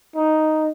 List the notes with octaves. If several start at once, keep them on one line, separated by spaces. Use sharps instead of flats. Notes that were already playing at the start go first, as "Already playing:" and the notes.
D#4